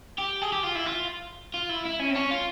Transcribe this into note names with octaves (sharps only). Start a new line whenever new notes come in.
G4
G#4
G4
F4
E4
F4
F4
E4
E4
C#4
C4
C#4
F4